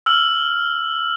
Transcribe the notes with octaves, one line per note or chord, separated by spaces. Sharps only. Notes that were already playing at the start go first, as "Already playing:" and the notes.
E6 F6 F#7